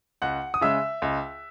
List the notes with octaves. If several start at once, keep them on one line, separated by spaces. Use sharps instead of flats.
C#2 F#5 F#6
D#6
C#3 G#3 E5 E6
C#2